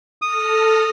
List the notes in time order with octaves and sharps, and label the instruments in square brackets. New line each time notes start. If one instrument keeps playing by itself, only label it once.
[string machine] A4 F6 A#6 [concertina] D#6